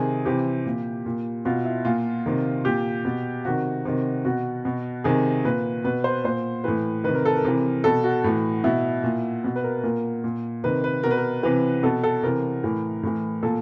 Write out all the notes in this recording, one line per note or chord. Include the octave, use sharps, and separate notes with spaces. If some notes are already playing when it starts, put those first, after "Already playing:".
Already playing: C3 D#3 G#4
C3 E3 G4
A#2
A#2
B2 F4
E4
A#2 F4
C3 D#3
A#2 G4
B2
C3 D#3 F#4
C3 D#3
B2 F#4
B2
C3 D#3 G#4
A#2 B4
B2 B4
C5
A#2 C5
A2 E3 B4
C3 D#3 B4
A#4
A4
A#4
C3 E3
B2 A4
F#4
A2 E3
B2 E4
A#2
B2
B4
A#4
A#2 A#4
A#2
C3 D#3 B4
B4
B2 A#4
B4
A#4
C3 E3 B4
B2 A4
A4
C3 E3 A#4
A2 E3
A2 E3
A#2 A4